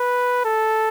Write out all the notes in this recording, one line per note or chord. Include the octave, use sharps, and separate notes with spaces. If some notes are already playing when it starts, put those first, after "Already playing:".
Already playing: B4
A4